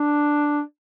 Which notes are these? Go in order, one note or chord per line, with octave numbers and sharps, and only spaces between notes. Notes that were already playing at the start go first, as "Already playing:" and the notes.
Already playing: D4